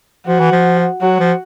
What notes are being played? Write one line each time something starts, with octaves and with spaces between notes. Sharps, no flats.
F3 F#4
E3
F3
F#3 F#4
F3